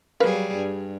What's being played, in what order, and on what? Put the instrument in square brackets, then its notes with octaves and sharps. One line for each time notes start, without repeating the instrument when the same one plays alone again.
[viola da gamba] F#3 G3 G#4 [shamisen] A#4 B4 F5
[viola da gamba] G2